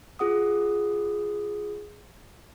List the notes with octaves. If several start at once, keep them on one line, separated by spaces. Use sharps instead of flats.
F4 G#4 F#5 D#6